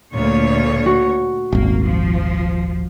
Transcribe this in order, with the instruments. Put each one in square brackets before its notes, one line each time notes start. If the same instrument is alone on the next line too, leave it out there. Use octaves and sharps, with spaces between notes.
[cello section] D2 A#2 C#5
[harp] F#4
[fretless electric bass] D#1 G#1 [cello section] A#3
[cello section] F3